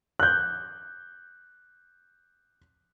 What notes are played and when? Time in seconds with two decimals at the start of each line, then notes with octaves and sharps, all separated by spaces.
0.20 F#6 G6